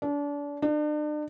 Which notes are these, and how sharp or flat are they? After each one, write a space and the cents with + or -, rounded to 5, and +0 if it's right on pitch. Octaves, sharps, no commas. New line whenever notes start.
D4 -30
D4 +40